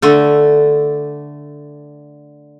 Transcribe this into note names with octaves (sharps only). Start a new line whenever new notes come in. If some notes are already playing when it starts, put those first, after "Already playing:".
D3 A3